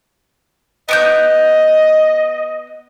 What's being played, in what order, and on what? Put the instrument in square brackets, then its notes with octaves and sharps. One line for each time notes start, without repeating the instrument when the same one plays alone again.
[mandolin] B3 D6 G6 [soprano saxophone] D#5